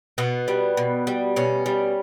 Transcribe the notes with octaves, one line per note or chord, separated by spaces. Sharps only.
B2 B3
G3
B2
G3
B2 C#4
G3